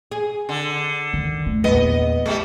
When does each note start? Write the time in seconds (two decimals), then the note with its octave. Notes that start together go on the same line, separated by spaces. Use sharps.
0.12 G#4
0.49 D3
1.13 D#3
1.46 A3
1.64 A#1 E2 B3 D#5
2.26 G3 G#3